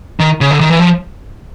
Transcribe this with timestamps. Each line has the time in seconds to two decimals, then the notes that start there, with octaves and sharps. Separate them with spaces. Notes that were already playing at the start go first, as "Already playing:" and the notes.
0.20 D#3
0.41 C#3
0.51 D3
0.61 D#3
0.70 E3
0.79 F3